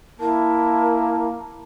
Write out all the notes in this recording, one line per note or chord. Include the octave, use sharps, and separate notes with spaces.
A#3 E4 A#4 A5